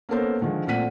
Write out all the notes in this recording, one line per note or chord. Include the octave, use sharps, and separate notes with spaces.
A#3 B3 C#4 A4 A#4 C5
D3 D#3 F3 G#3
A#2 A3 C4 F#5 B6 D#7